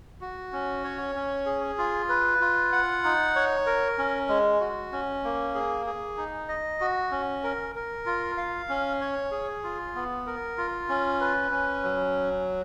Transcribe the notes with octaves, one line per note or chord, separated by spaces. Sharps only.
F#4
C#4
C#5
C#4
G#4
F4
B4
F4
F#5
D#4
C#5
A#4
C#4
G#3
F#4
C#4
A#3
G#4
G#4
D#4
D#5
F#4
C#4
A#4
A#4
F4
F5
C#4
C#5
G#4
F4
B3
A#4
F4
C#4
B4
C#4
F#3